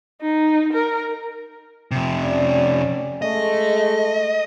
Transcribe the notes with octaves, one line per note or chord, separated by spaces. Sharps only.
D#4
A#4
F2 C3
C#4 D5
G#3 A3 D#5